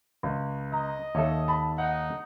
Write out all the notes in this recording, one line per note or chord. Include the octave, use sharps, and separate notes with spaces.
C#2
D#5 A#5
D#2 A4 C#5 E5
A5 B5
D#4 F#5